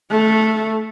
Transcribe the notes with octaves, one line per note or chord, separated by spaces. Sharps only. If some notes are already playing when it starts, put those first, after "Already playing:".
A3